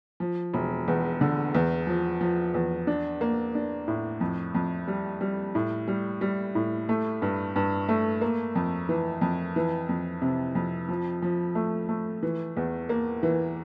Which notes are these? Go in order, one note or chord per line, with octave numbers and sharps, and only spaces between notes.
F3
E1
E2
D3
E2
F3
F3
E2
D4
A#3
D4
A2
F2
F2
G3
G3
A2
G3
G3
A2
A3
G2
G2
A3
A#3
F2
E3
F2
E3
F2
C3
F2
F3
F3
A3
A3
E3
E2
A#3
E3